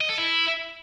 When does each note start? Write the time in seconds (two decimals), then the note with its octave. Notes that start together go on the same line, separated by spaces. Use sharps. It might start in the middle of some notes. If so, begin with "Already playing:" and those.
0.01 D#5
0.09 A4
0.18 E4